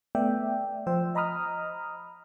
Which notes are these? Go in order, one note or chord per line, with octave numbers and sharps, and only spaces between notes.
A3 B3 D5 E5 G5
F3 C5 G5 E6
D#5 A#5 B5 D#6 F6